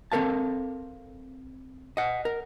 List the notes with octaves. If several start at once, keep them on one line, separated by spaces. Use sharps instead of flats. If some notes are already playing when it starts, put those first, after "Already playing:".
C4 A4 A#4 F5 A5
D#5 F#5
A#4